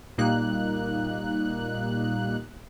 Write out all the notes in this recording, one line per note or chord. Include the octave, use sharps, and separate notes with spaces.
A#2 G3 A#3 D#4 F#6